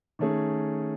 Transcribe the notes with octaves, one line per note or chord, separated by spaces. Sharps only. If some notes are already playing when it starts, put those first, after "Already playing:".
D#3 A3 C#4 G#4